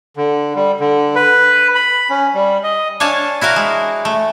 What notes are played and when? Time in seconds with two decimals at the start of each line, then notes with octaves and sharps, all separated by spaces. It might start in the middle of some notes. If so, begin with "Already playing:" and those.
0.17 D3
0.55 G3
0.80 D3
1.15 B4
1.75 B5
2.10 C#4
2.34 G3
2.63 D#5
3.00 D4 C#5 F5 G#5 A5
3.41 E4 F#4 A#4 F5
3.56 G#3
4.05 A3